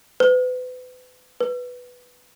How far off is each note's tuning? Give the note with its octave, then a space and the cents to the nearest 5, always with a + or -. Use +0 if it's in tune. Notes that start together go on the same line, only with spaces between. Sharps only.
B4 +35
B4 +0